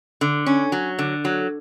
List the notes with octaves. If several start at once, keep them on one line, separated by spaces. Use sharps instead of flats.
D3
C#4
F#3
D3
F#3